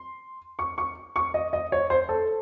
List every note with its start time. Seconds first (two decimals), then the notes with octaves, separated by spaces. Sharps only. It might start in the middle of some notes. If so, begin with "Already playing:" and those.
Already playing: C6
0.59 C#6
0.78 C#6
1.16 C#6
1.34 D#5
1.53 D#5
1.72 C#5
1.90 C5
2.09 A4